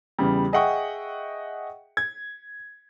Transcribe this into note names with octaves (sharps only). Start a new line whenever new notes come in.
E2 C#3 G3
G#4 D#5 E5 F#5 G5 C#6
G#6